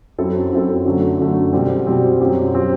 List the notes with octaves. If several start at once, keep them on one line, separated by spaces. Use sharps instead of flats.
F#2 F#3 C4 E4 A4
F#2 F#3 C4 E4 A4
F#2 D3 F#3 A3
F#2 D3 F#3 A3
B2 G3 C4
B2 G3 C4
F#2 F#3 C4 G4
F#3 C4 G4